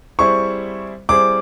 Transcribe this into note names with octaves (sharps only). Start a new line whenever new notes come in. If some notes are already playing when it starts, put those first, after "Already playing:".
G3 C4 E4 G#4 C5 C#6
G3 C4 E4 G#4 C5 D6